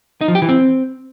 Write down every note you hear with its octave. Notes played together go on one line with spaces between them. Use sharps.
D#4
F3
G4
E3
C4